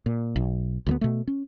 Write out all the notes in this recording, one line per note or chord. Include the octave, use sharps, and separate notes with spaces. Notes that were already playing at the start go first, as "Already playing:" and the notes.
A#2
B1
D2 E3 B3
B2 A3
C#4